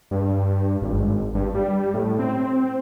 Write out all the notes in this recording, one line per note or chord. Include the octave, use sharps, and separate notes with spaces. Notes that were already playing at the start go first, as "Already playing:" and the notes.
G2
G#1
G2
G3
A2
C4